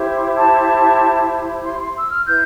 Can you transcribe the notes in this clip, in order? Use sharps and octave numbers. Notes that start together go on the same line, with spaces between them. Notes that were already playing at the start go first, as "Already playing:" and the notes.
Already playing: E4 G4 C5
A5
C6
C6
E6
F6
E4 B4 G6